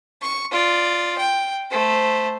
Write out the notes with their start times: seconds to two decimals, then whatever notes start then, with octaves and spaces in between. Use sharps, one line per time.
0.22 C#6
0.51 F4 D5
1.18 G5
1.71 A3 C5